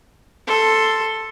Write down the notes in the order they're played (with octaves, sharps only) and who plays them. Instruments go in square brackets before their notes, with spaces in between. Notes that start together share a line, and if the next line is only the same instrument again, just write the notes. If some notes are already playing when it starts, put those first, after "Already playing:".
[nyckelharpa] A4 C6